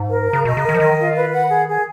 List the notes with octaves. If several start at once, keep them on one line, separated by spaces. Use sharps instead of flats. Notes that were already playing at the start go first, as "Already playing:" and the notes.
Already playing: G#2
A#4
A#5
C#3
B2 D#5
C#3
A#4
D#3
F3
D#3 D#5
F4
B4
F#5
G#4
G#4